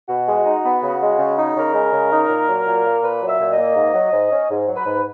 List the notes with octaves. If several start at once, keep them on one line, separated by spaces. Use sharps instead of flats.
B2 F#4
G#3
D#4
B3
C#3
G#3
C#3
D#4
C#3 A#4
G#3
C#3
D#4
A#2
F#3
A#2
A#3
A#2 B4
F#3
E5
A#2
D#5
A#3
G#2
F#3
G#2
C#4
G#2
F#3
B4
G#2